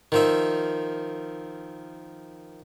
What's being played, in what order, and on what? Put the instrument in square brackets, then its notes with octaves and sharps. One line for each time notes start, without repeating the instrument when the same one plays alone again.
[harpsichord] D#3 F3 E5